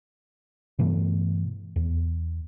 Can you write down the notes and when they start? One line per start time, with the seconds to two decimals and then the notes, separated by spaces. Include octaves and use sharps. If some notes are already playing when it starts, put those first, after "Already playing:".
0.79 G2 B2 E3 A3
1.76 E2